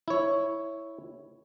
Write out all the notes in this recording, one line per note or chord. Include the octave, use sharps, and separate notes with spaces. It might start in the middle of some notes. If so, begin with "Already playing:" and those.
E4 C#5